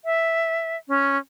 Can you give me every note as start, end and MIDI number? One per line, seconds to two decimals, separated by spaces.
0.05 0.77 76
0.88 1.17 61